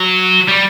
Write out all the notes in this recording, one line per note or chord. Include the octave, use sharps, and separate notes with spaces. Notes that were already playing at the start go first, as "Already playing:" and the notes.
Already playing: F#3
G3